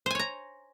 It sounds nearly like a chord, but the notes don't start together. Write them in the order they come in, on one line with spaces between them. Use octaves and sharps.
C5 G#5 C#5 A#5